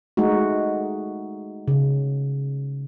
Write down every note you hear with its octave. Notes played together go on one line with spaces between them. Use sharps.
G#3 A3 D#4 F#4
C#3